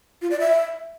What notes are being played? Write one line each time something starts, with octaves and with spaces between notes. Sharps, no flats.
F4
D5
E5